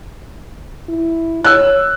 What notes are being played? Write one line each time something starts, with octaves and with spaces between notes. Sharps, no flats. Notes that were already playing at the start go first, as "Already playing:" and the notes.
E4
C#5 E6 F#6